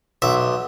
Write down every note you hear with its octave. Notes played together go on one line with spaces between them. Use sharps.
B1 E5